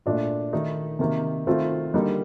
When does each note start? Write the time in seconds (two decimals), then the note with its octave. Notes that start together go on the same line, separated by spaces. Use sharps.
0.06 A#2 A3 D4 F4
0.53 D#3 A3 D#4
0.99 C3 D#3 A#3
1.47 D#3 A3 C4 F4
1.94 D3 G3 A#3 D#4